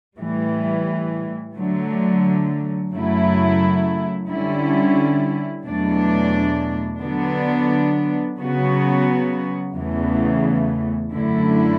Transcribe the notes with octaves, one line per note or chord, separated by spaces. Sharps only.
A2 E3 G3
D3 F#3 A3
F#2 C#3 F#3 A3 E4
D3 G3 C#4 E4
E2 B2 F#3 A3 D4
D3 F#3 B3 D4
C#3 F#3 B3 F#4
E2 C#3 E3 A3
F#2 D3 A3 E4